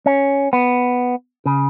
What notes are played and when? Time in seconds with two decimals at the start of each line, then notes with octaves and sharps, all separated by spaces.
0.06 C#4
0.53 B3
1.46 C#3